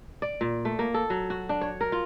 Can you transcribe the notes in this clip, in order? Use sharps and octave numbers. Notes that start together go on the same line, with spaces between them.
D5
A#2
A3
A#3
A4
F#3
F#4
D4
C#5
A#4
F4